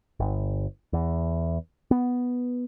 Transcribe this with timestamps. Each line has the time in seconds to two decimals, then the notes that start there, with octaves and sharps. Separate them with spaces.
0.20 G1
0.93 E2
1.91 B3